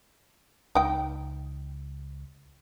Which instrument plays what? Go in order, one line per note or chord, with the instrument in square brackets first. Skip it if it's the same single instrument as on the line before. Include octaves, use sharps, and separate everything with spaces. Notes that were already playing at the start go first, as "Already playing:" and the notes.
[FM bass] C#2 [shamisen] D#4 G5